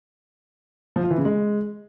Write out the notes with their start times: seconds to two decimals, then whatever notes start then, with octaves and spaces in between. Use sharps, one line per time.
0.96 F3
1.03 F4
1.10 E3
1.18 C#3
1.25 G#3